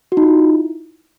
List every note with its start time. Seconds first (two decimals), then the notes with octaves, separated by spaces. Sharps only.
0.12 F#4
0.17 D#4
0.22 F4
0.28 E4